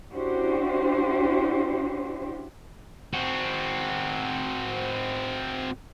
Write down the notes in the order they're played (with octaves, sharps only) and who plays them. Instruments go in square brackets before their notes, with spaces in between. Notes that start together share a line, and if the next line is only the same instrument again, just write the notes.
[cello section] C#4 D4 E4 F#4 G4 C5
[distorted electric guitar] C4 F#4